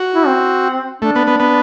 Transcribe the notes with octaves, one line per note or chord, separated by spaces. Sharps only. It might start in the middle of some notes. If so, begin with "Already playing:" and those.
Already playing: F#4
E4
C4
A3 D4
B3
B3
B3